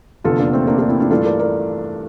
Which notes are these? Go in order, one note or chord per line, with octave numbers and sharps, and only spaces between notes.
F1 E2 D3 F4 A4
A#3 D4
A3 C4
A#3 D4
A#3 D4
C4 E4
D4 F4
G2 E3 A3 D4 E4 F4 A4
A#4 D5
A#4 D5